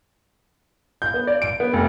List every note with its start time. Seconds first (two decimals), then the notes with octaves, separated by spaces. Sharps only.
1.02 G6
1.14 B3
1.27 D5
1.42 D7
1.60 B3
1.73 F1